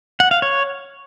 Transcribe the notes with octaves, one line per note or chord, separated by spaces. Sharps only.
F#5
F5
C#5